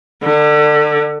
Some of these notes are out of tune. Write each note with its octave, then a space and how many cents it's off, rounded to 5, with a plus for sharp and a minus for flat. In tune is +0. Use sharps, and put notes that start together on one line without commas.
D3 +30